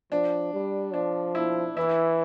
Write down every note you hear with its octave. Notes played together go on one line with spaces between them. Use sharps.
F3 D4
G3
F3 D4
E4
E3 E4